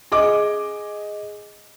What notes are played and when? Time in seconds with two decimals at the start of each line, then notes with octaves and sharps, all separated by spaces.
0.12 G#4 D#5 D6